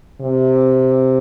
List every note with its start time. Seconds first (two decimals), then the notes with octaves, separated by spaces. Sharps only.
0.21 C3